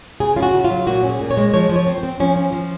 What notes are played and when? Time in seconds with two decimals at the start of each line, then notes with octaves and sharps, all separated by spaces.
0.20 C#3 G#4
0.36 C#4 F4
0.43 F#4
0.53 C#3
0.64 F4
0.70 F#3
0.87 A#2 F#4
1.03 C#4
1.09 G#4
1.21 A#2
1.31 C#5
1.37 G#3
1.53 F3 C#5
1.69 F3
1.76 C#5
1.87 C4
1.98 C5
2.03 C4
2.20 F3 C#4
2.36 C#4
2.53 F3